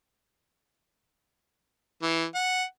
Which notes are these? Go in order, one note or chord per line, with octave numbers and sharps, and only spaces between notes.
E3
F#5